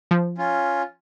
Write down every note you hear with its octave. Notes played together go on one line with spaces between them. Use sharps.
F3
C#4 F4